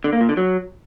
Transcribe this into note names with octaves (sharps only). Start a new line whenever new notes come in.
D3
A#3
A#2
D3
F#3